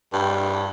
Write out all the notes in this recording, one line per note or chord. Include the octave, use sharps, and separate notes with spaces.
G2